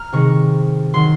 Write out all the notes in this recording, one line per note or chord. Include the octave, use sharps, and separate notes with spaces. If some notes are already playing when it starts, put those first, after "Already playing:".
Already playing: A#5 F6
C3 D#3 G#3 C#6
D#3 F#3 C6